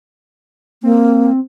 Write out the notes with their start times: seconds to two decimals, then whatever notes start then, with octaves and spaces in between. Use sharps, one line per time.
0.83 A#3 C4